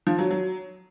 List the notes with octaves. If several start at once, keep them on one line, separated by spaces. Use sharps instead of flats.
F3
F#3
F#3